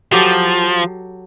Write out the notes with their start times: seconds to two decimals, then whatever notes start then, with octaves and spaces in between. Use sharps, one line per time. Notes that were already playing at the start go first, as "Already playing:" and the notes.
0.12 F3 F#3 G4 A4